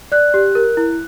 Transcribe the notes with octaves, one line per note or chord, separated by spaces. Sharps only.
D5 F#6
G4
A#4
E4